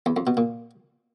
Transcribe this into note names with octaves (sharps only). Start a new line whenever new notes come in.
E2
F2
B2
A#2